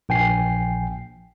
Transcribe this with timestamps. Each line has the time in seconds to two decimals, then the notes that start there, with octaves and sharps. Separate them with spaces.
0.09 A#1 G5 G#5 C7